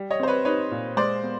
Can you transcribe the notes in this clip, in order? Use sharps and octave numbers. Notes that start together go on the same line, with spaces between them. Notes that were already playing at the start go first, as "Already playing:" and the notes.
Already playing: G3
C#5 D#5
C4 C5
B4 C#5
D#4 B4 C#5
A#2
G#3 C5 D5
B3